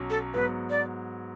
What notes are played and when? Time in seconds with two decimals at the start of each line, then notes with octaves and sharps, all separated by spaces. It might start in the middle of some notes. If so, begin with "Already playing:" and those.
Already playing: B1 F#3 C#4
0.10 A4
0.34 G#2 F#3 B3 B4
0.70 D5